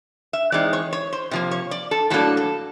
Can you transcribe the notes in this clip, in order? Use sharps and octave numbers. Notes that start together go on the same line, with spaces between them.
E5
E3 G#3 C4 D#4 D5
C#5
C#5
C5
C3 F3 A#3
C#5
D5
A4
A2 F#3 A#3 D4 A4
A4